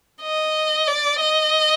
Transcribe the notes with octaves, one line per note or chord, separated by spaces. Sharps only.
D#5
D5
D#5